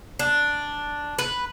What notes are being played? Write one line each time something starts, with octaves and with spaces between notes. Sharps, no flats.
D4
B4